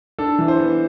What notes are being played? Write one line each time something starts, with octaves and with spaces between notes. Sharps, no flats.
D4 A4
E3
C5
B3